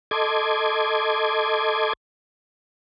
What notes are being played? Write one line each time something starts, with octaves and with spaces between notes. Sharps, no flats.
A4 D#5 C6 D6 G#6